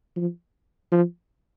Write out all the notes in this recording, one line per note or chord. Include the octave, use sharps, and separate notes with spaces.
F3
F3